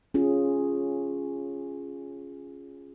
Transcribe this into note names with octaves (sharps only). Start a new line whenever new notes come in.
C#4 F4 G#4